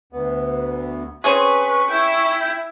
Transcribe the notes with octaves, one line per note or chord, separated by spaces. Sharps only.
D2 B3
C4 C#4 G#4 B4 C#6
E4 G5